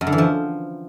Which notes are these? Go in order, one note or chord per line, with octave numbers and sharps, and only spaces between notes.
F#2
D3
E3
F3